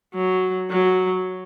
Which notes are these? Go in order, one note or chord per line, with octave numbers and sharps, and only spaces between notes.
F#3
F#3